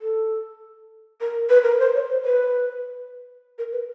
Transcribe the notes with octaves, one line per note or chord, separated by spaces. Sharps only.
A4
A#4
B4
A#4
B4
C5
C#5
C5
B4
A#4
B4